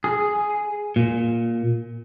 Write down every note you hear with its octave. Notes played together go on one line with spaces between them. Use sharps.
G#4
A#2